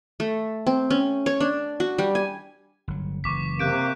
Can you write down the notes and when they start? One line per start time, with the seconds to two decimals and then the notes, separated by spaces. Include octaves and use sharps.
0.20 A3
0.67 C4
0.90 C#4
1.26 C#5
1.40 D4
1.80 F#4
1.98 G3
2.15 G#5
2.88 G1 F#3
3.24 F#1 E3 C#6 D6 B6
3.59 C3 A#3 F#6 G6 D7